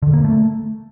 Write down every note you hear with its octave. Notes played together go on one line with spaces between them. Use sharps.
D3
A#3
A3